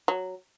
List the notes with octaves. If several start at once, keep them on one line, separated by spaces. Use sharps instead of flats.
F#3